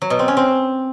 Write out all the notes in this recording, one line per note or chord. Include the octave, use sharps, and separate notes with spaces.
F#3
B2
C4
C#4
C4